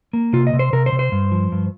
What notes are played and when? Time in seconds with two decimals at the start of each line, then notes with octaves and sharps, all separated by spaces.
0.13 A#3
0.33 C3 F4
0.47 D#5
0.53 C3
0.59 C5
0.73 C3 A#4
0.86 C5
0.92 C3
0.99 C5
1.12 G2
1.32 F3
1.52 G2